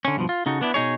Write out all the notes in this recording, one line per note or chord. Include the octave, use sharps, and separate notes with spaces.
D3 C#4
G2 B2 F3
F4
C#3 D#4 F#4 A4
B3 D4 E4
B2 D#4 G#4 C#5